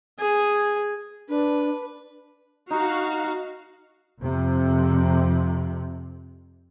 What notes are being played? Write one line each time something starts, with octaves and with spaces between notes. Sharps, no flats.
G#4 G#5
D4 B4
D#4 F#4 F5
F2 C3